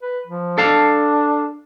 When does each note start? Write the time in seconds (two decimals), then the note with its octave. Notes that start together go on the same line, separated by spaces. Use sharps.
0.02 B4
0.27 F3
0.58 D4 A4 F5 A5